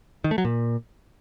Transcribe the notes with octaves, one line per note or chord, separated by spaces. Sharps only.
D#3
A3
F#3
A#2